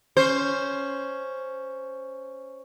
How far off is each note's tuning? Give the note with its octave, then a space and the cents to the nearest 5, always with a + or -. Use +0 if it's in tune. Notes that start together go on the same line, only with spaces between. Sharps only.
C#4 +0 C5 +0